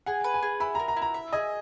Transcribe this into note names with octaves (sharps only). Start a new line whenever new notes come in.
G#4 F#5
B4
G#5
G#4
E4 B5
A#5
A#4
A#5
E4
A#5
E5
G#4 D#5